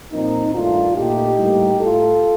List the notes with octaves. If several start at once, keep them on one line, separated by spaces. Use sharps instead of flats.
A#2 F3 A#3 C4 D#4
G2 D#3 A3 D4 F4
A#2 A3 D#4 G4
A2 G3 A#3
A2 A3 F4 A4